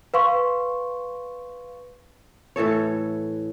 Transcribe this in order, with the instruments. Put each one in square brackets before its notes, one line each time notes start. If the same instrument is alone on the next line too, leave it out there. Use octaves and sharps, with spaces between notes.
[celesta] B4 F5 C6 C#6
[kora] A2 E3 A4 C#5